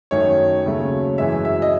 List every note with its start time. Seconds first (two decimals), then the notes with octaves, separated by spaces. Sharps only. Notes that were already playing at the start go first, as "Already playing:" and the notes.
0.11 F#2 D#3 A3 C#5
0.66 D#2 C#3 F#3 A3
1.18 F#2 E3 G#3 E5
1.45 E5
1.62 D#5